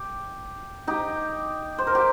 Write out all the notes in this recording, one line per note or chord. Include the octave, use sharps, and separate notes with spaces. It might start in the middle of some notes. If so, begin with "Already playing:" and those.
Already playing: G4
D#4 G4
C5
A#4
G4